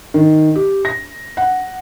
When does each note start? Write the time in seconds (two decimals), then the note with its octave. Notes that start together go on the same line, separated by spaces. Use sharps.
0.14 D#3
0.56 G4
0.85 A#6
1.37 F#5